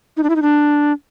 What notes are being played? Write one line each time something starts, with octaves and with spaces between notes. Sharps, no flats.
D#4
D4
E4
D#4
D4